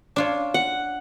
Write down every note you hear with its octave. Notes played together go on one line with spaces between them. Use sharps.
D4 F4 C#5
F#5